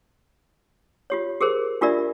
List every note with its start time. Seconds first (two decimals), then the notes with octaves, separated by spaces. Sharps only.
1.10 F4 G4 C#5
1.41 G4 G#4 A#4 C5
1.81 D4 F4 G4 A#4 D5 E5